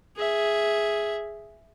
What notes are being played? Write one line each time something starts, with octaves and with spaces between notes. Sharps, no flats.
G#4 E5